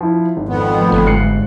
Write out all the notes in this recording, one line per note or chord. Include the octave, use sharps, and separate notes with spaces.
F3 E4
G#1
F2 B3
F3 A3
G1
G#2 F#6 C7 C#7